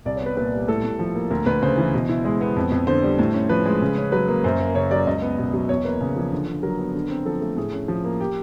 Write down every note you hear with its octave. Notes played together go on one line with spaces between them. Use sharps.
C2 D5
B3 C#5
B4
A#2 B4
G3
A2 A4
A2
F3
A#3
D2 A#4
D2 B4
C#3 C5
E3
B2
E4
G#3
B3
F2
F2
D3 C5
G3
A2
C#4
F3 B4
G#3
C#3
C#4
F#3 B4
A#3
F#2 C5
A#3
C#3 C#5
F#3 D5
C#2 D#5
B3
B2
F#3
E2 C#5
A#3 B4
C#3
F3
D3
D3
F#3 A#4
B3
D3
C4
F3 A4
A3
A2 G#4
C#4
F3
A#3
G4